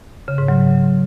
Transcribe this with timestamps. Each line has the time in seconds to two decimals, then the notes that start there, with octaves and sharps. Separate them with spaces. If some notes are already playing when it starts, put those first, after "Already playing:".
0.28 C#3
0.38 G#2
0.48 F#3